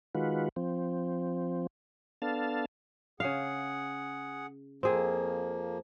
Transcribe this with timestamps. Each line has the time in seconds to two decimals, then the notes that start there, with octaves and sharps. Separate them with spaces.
0.15 D#3 G#3 F4 F#4 B4
0.56 F3 C4
2.22 B3 D4 A4 F5 A5
3.20 C#3 G#4 F5 F#5
4.83 F2 F3 A#3 C4 G#4